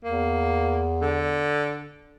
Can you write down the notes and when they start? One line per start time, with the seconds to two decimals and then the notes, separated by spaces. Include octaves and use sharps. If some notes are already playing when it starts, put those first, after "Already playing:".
0.04 E2 A#3
1.02 D3